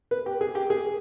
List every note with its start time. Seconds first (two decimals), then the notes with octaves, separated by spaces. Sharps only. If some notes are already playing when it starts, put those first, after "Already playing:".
0.11 B4
0.26 G4
0.41 G#4
0.55 G4
0.70 G#4